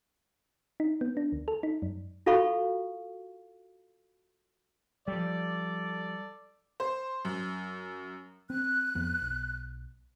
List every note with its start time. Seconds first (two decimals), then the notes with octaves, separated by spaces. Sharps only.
0.80 D#4
1.01 B3
1.17 D4
1.32 D2
1.48 A4
1.63 D#4
1.82 F#2
2.26 F4 F#4 A4 F5 B5 C#6
5.08 F3 G3 A4 D5
6.80 C5
7.25 F#2
8.50 C4 F#6
8.95 F2 B3
9.21 B1